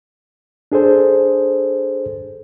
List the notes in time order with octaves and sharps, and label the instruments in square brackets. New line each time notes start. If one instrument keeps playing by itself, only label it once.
[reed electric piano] D4 G#4 A4 C5